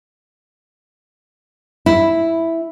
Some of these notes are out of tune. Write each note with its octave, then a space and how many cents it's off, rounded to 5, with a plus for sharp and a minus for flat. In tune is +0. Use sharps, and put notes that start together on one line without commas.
E4 +0